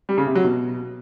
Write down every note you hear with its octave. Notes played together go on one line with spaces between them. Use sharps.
G3
C#3
C3
F#3
B2